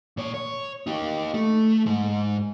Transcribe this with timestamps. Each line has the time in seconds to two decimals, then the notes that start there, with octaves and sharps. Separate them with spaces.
0.17 A#2 C#5
0.34 C#5
0.87 D#4 G4
1.34 A3
1.86 G#2 G#3